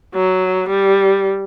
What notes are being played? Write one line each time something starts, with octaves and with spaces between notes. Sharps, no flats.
F#3
G3